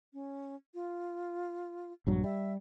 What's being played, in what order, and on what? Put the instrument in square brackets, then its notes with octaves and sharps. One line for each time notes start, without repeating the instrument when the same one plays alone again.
[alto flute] C#4
F4
[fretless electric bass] A#1 G2 F#3
[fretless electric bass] G3 [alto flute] E5